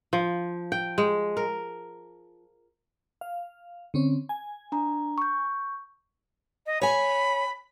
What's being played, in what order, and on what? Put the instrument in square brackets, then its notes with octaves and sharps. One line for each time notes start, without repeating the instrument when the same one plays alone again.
[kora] F3
G5
G#3
A#4
[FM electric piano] F5
D3 C4 C#4
G#5
[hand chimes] D4 A#5
C#6 G6
[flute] D#5
[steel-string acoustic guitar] C#5 G#5 [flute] B5